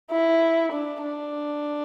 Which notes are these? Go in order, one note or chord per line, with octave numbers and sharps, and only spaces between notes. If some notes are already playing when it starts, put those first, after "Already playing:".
E4
D4
D4